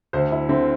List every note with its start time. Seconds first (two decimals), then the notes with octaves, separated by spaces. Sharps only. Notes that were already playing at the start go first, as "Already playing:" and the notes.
0.13 D2 C5
0.32 E4
0.49 D3 C4